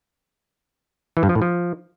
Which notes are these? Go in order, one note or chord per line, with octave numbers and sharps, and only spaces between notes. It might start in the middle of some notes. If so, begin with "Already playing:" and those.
E3
G2
F3
A2
F3